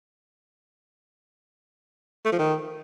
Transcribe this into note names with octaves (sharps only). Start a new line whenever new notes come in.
A3
F3
D#3